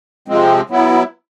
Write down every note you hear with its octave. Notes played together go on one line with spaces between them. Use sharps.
C3 F3 G#3 C4
F#3 B3 E4